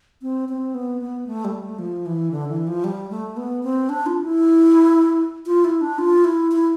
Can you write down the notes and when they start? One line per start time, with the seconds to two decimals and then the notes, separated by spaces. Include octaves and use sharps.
0.22 C4
0.49 C4
0.75 B3
1.01 B3
1.27 A3
1.45 G3
1.62 A3
1.79 F3
2.06 E3
2.31 D3
2.49 E3
2.67 F3
2.84 G3
3.11 A3
3.37 B3
3.63 C4
3.89 D4
4.06 F4
4.23 E4
5.46 F4
5.64 E4
5.81 D4
5.98 F4
6.24 E4
6.52 E4